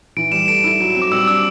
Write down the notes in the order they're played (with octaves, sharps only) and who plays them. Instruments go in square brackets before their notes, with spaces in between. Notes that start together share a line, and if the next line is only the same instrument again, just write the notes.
[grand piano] E3 [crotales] D7
[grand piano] G3 [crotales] E7
[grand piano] A3 [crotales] D7
[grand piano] E4
F#3
C4
[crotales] D6
[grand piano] G3 [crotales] E6
[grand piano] D4 [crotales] E6